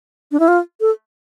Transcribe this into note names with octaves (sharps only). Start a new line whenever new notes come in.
D4
E4
F4
A4